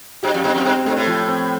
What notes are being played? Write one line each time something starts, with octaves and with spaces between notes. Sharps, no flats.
G2 G4
F2
G2 C4
F2
G2 C4
G2 A3
A2
F3
C4